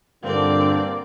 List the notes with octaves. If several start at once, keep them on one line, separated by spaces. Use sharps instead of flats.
G2 A#2 D3 A#3 C4 D5